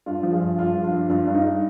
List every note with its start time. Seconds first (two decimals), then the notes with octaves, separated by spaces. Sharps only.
0.06 G2 D4 F4
0.23 F3
0.32 F4 G#4
0.41 G2
0.58 G2 D4 F4
0.75 F3
0.83 D4 F4
0.92 G2
1.10 G2 D4 F4
1.27 G2
1.35 D#4
1.44 G#3